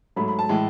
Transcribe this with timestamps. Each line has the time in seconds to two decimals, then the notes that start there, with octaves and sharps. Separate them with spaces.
0.16 G#2 F#3 A3 B5
0.28 B5
0.39 A5
0.49 A2 E3 G#3